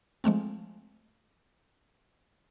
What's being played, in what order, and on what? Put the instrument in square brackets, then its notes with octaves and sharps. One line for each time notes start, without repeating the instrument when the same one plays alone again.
[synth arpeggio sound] F3 G#3 A3 C4